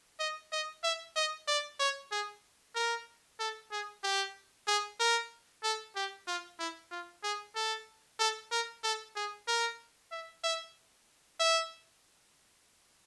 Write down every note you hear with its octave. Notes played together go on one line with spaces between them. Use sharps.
D#5
D#5
E5
D#5
D5
C#5
G#4
A#4
A4
G#4
G4
G#4
A#4
A4
G4
F4
E4
F4
G#4
A4
A4
A#4
A4
G#4
A#4
E5
E5
E5